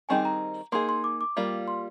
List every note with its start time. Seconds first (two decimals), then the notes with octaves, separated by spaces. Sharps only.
0.09 D#3 G3 C4 D#4 G#4 G#5
0.25 A#5
0.72 A#3 D#4 G#4 C6
0.89 C6
1.04 D6
1.21 D6
1.37 G3 A#3 F4
1.68 C6